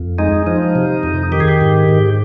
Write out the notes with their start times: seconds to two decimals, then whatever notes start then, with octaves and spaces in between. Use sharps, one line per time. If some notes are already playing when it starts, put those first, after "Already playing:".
Already playing: F2
0.19 G#3 D#4
0.46 F3 D#4
0.75 C3
1.03 F2
1.32 D#3 G4
1.40 G#4
1.48 G4
1.61 G#2
1.88 G#2